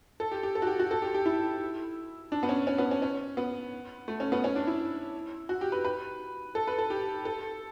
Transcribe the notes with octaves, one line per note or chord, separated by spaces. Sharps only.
A4
G4
G4
A4
F#4
G4
F#4
A4
G4
G4
E4
D4
B3
C#4
C#4
B3
C#4
C#4
B3
A3
C#4
B3
C#4
D4
E4
F#4
G4
B4
B4
A4
B4
A4
G4
A4